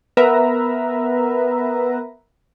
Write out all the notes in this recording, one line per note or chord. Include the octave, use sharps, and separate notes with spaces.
B3 A#4 B4 E5 A#5